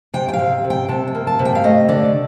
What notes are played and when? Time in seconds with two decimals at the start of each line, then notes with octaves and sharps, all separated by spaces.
0.13 C3 G5
0.28 G5
0.33 F5
0.39 C3
0.64 C3
0.70 G5
0.88 C3 A5
1.07 G5
1.15 A#3
1.27 A5
1.39 C3
1.45 G5
1.55 F5
1.64 A3 D#5
1.88 D3 D5